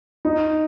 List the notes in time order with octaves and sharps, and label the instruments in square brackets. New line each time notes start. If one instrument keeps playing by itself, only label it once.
[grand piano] D#4